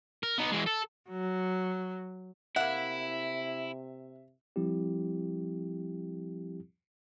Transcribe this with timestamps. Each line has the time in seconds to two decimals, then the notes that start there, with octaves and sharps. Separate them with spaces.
0.23 A#4
0.38 B3 D#4
0.51 E3 G#3
0.66 A4
1.10 F#3
2.56 C3 A#3 E4 E5 F#5
4.56 F3 G3 C4 E4 G4